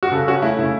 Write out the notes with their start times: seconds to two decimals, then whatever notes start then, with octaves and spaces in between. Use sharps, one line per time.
0.03 F#4
0.12 C#3 A4
0.28 C#4 F#4
0.42 A3 E4
0.59 C#3 E4